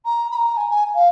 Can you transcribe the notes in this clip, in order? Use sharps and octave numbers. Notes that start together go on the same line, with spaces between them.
A#5
B5
A#5
G#5
G#5
F5